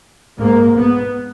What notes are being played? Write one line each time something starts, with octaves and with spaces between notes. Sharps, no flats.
G#2 A#3
B3